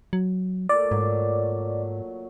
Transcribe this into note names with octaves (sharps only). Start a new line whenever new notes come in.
F#3
A#2 A3 D5
G#2 F#3